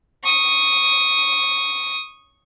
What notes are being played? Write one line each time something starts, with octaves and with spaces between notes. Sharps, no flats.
C#6 D#6